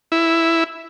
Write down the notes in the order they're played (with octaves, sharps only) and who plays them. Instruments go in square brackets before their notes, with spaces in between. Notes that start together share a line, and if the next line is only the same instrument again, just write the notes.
[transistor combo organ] E4